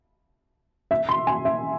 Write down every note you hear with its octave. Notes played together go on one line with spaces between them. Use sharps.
E5
C6
G#5
E5